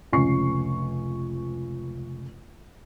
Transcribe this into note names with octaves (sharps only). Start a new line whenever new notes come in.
F1 C#2 C#4 G#5 C#6 C7